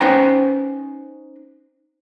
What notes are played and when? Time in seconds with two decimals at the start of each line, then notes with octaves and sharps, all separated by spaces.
0.01 C#4 D#4 B4 C5 G5 A#5